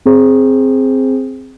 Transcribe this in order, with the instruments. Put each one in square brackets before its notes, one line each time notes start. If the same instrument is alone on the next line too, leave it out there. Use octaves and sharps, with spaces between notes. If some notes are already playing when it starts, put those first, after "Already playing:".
[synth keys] C4 G#4 C5